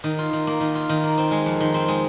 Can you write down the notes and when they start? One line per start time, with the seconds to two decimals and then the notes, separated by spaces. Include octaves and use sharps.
0.04 D#3
0.19 F4
0.33 D#3
0.47 A#3
0.60 D#3
0.75 F4
0.89 D#3
1.04 A#3
1.18 C4
1.31 G#3
1.46 F2
1.61 D#3
1.74 C4
1.88 G#3